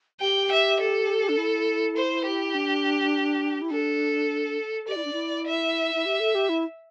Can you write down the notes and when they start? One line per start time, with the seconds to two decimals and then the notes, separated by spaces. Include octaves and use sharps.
0.20 G4 G5
0.51 E5
0.80 A4
1.29 D4
1.37 E4
1.96 C5
2.25 G4
2.54 D4
3.62 E4
3.71 D4 A4
4.88 G4 D5
4.96 E4
5.05 D4
5.13 E4
5.47 E5
5.95 E4
6.06 G4
6.20 A4
6.35 G4
6.49 E4